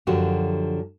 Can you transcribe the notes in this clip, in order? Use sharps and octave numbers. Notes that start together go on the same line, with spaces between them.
F#2 D3 F3 F#4 G4